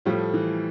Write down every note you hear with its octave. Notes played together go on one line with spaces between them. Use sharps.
A2 F3 G3 A3
E3